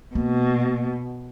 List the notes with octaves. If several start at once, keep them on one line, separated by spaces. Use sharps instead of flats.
B2 A#3